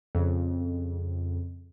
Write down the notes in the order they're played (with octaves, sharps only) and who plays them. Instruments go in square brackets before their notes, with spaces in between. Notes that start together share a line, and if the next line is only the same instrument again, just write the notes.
[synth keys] F2 C#3